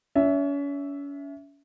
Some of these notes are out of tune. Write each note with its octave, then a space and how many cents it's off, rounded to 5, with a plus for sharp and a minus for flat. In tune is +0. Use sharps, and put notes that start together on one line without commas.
C#4 +35 E5 +0